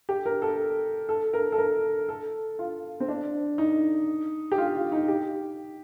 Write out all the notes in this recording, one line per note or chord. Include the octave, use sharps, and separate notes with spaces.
G4
A#4
A4
A4
A#4
A4
A#4
A4
F4
C4
D4
D#4
G4
F4
F4
D#4
G4